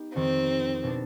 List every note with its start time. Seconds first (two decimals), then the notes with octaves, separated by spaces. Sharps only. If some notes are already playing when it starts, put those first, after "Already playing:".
Already playing: B3 D#4 G4
0.14 F2 D#3 G3 C4
0.83 B2 B3 D4